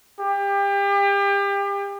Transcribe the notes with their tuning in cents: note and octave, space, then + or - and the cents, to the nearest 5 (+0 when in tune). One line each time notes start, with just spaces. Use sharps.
G4 +30